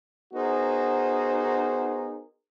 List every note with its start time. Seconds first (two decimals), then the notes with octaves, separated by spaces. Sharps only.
0.34 B3 D#4 F#4 G#4 A#4 C5